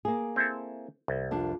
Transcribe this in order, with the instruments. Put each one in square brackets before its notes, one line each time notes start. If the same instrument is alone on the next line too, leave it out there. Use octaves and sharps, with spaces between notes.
[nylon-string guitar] A#3 G#4
[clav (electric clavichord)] C4 E4 A4
C2
[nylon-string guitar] F2 D4